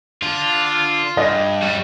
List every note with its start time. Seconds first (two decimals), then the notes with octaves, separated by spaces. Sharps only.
0.23 D3 F4
1.17 G2 D#5
1.62 G3 F#4